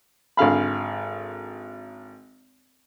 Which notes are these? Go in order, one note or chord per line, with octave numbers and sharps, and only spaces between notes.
G#1 D3 F5 B5